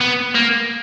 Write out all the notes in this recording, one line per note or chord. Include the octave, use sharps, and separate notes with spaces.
B3
A#3